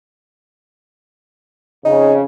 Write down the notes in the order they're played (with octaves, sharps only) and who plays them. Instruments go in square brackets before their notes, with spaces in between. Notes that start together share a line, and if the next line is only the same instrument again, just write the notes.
[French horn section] F2 C#3 [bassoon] D#4